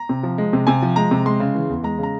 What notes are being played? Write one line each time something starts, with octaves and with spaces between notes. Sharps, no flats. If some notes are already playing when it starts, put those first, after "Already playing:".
Already playing: A#5
C3
F3
G#3
C3
C3 G#5
F3
G#3 A#5
C3
G#3 C6
C#3
E3
E2
G#3 A#5
C#3 A#5